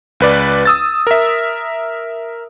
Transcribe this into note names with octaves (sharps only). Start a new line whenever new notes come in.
C#2 B4 D5
D#6 E6 A6
A#4 E5